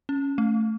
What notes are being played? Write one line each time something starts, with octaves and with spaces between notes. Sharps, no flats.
C#4
A3